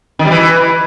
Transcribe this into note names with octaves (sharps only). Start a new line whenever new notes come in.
D#3
G3
E3